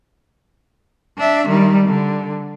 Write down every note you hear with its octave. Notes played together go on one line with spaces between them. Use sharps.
D4 E5
D#3 G3
D3